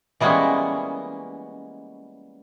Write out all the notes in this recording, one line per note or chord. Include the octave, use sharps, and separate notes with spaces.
E3 G3 G#3 A#3 B3 C#4